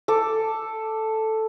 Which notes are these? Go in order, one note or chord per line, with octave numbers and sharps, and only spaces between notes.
A4 D6